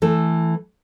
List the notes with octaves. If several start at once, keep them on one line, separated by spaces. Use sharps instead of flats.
E3 A3 A4